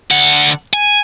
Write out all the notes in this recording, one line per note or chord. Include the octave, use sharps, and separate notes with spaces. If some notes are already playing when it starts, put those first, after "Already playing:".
D2 F#5
G#5